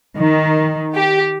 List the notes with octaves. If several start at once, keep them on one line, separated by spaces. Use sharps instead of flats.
D#3
G4